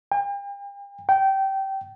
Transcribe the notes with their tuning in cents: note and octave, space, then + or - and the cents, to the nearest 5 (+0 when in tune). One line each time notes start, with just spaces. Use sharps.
G5 +40
G5 -20